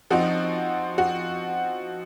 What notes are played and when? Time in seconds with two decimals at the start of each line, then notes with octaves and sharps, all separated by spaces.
0.10 F3 C4 D#4 F#4
0.98 F#4